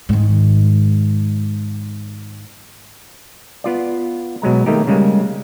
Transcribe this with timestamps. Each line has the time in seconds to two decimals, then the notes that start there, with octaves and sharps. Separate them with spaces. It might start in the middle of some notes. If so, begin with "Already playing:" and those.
0.09 G#2 D#3
3.64 B3 F4 D5
4.42 B2 F#3 G#3 A#5
4.66 D#3 A3 A#3 D#4 G4
4.87 C#3 G3 G#3 A#3